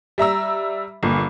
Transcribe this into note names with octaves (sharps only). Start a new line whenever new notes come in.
G3 E5 A#5 E6
G1 A#2